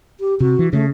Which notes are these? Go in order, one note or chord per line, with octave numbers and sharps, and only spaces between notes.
G4
C3 F#4
E3
C#3 A3